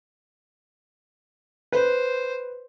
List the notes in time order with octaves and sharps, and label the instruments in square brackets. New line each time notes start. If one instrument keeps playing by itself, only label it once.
[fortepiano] B4 [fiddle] C5